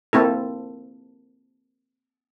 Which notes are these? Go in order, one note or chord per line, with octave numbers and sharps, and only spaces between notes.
A#3 C4 E4 A4